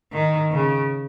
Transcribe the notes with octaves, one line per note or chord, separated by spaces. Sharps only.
D#3
C#3